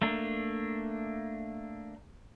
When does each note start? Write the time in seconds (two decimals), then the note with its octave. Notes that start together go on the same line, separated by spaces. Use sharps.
0.02 A3 A#3 D4